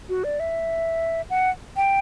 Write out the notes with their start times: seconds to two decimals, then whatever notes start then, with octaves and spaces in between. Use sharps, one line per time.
0.09 F#4
0.24 D5
0.40 E5
1.30 F#5
1.76 G5